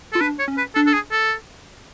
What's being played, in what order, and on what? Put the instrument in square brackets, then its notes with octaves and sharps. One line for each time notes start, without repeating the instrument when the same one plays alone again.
[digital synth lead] F4 [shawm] A4
[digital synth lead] D4 [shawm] B4
[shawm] C#5
[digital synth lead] C#4
[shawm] B4
[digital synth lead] D4 [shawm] A4
[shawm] A4
G#4
A4